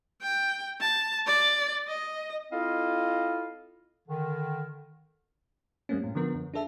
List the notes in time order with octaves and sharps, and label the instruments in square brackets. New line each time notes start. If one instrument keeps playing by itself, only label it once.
[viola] G5
A5
D5
D#5
[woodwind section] C4 E4 F4 A4 D#5 F5
D3 D#3
[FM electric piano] F2 G3 A3 A#3 C4 C#4
A2
D3 F3 B3 A#4
F2
D4 G#4 A4 E5 A5